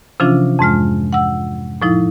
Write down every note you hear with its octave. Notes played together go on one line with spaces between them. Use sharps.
C3 E3 F3 C#4 D4 F4
F2 G#2 G#3 F6
F#5 E6
A2 F3 D#4 E4